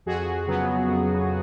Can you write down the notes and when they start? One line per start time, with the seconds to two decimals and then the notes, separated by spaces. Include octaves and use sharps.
0.06 F2 F#4 G#4
0.47 C#3 F#3 B3
0.88 F2